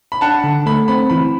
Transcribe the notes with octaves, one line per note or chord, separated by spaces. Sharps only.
B5
D4 F#5 A5
D3
A3 B5
C4 B5
E3 B5